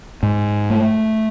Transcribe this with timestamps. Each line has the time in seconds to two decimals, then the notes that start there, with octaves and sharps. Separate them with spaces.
0.23 G#2
0.70 A3